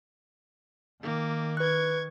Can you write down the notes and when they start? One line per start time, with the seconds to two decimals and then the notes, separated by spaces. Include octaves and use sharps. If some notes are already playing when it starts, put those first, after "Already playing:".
1.03 D#3 A#3 D6
1.57 B4 C#6 F#6 G#6